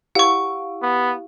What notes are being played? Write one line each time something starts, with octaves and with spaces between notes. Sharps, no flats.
E4 G4 F5 F#5 C#6
B3